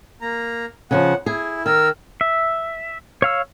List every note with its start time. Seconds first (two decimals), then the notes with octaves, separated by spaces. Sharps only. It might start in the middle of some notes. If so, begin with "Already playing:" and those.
0.21 A#3 A#5
0.91 C#3 E3 F3 F#5
1.26 E4 G#4
1.66 D#3 A#4 E6
2.21 E5
3.22 C#5 F5 E6